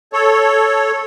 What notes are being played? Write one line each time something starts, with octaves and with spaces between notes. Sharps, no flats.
A4 C#5